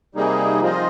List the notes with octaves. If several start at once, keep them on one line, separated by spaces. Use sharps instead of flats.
C3 G3 A#3 D#4 G#4
F3 C4 F4 C5 D#5